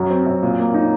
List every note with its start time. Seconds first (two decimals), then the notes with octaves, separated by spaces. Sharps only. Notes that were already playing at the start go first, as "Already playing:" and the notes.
Already playing: F#2 F#4
0.10 C4
0.26 F#2
0.43 A#2
0.59 A#3
0.74 D#4